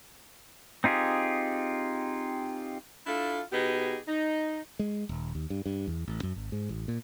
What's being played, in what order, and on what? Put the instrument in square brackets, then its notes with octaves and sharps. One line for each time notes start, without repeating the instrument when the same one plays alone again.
[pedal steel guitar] C4 D#4 F4 G4 G#4
[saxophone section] D4 E4 F4 A4
B2 B3 D#4 G4 G#4
D#4
[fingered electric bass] G#3
D#1
D#2
G2
G2
E2
A1
F#2
G#1
G#2
A1
A#2